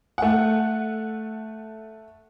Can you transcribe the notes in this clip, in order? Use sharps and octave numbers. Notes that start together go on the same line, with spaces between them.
A3 F#5